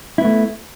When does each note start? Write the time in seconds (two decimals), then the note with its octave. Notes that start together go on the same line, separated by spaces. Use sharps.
0.18 E4
0.21 B3
0.25 A3